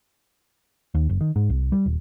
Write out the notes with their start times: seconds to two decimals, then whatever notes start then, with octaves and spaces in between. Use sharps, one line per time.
0.95 D#2
1.09 F#1
1.21 D#3
1.36 G#2
1.50 C2
1.72 G3
1.86 D#1